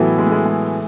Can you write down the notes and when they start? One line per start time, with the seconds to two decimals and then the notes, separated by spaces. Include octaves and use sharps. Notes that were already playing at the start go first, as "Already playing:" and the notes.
Already playing: A2 E3 F#3 B3 E4 A4
0.18 G#3
0.27 A3
0.32 G#3
0.45 G#3